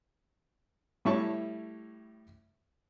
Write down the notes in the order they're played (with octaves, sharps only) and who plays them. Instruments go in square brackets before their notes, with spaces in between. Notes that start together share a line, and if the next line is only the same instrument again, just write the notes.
[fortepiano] A2 G3 E4 C#5 A5 C#6